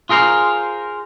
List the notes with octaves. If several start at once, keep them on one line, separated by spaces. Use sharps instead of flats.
F4 G#4 A#4 C5 F5